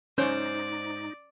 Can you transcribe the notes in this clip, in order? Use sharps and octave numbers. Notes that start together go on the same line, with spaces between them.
G#2 D#3 C#4 D#4 C5 D5